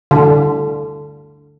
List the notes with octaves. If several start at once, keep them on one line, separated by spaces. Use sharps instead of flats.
D3